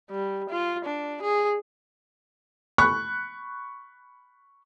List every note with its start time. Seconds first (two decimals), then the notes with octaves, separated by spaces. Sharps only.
0.11 G3
0.49 F4
0.85 D4
1.22 G#4
2.78 B5 C#6 F#6